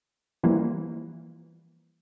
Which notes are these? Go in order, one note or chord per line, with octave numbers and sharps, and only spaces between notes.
E3 F3 G3 A#3